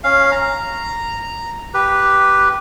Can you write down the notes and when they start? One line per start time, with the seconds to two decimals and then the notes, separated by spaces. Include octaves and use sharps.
0.04 C#4 F5
0.32 A#5
1.74 G4 B4